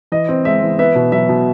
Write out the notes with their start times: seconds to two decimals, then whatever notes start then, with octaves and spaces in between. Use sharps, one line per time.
0.12 E3 D#5
0.29 C4
0.45 G#3 E5
0.62 E3
0.79 B3 E5
0.95 B2
1.12 F#3 E5
1.29 B2